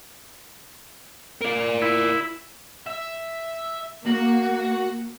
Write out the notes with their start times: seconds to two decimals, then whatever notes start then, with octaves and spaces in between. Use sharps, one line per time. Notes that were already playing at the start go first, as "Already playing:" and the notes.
1.41 A#4 D5
1.82 E4
2.86 E5
4.06 A#3 F#4